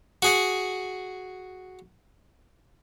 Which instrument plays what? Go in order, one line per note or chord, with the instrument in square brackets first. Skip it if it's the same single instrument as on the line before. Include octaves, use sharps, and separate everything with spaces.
[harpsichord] F#4 G#4 F#5